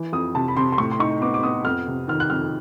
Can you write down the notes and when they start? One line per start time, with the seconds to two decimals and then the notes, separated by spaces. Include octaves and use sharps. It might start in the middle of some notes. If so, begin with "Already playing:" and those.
Already playing: E3
0.12 F2 D#6
0.35 C3 A5
0.48 B5
0.57 C3 C6
0.72 C6
0.78 A2 C#6
0.92 C6
0.99 D#4 C#6
1.21 B3 D6
1.34 D6
1.43 B3 D#6
1.65 F2 F6
1.88 C3
2.08 D#3 F6
2.20 F#6
2.30 F2 F6